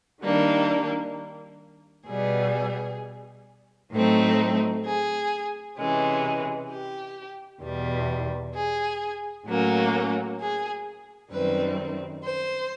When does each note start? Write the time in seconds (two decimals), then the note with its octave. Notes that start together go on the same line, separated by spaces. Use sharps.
0.22 D#3 G3 A#3 D4
2.07 B2 G3 B3 G#4
3.92 A2 F#3 A3 C4 D#4
4.85 G#4
5.77 C3 E3 G#3 C#4
6.70 G4
7.62 E2 B2 G3
8.54 G#4
9.47 A2 F#3 A#3 C#4
10.40 G#4
11.31 F#2 D#3 G3 C4 B4
12.24 C5